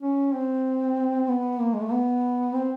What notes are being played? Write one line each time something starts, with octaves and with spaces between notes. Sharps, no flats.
C#4
C4
B3
A#3
G#3
A3
B3
C4